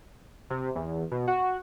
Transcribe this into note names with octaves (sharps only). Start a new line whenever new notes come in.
C3
E2
B2
F#4